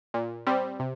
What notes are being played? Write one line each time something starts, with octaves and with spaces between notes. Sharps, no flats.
A#2
G3 C4
C3